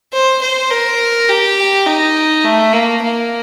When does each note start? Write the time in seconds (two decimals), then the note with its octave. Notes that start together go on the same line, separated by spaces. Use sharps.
0.12 C5
0.41 C5
0.70 A#4
1.29 G4
1.86 D#4
2.44 A3
2.73 A#3
3.02 A#3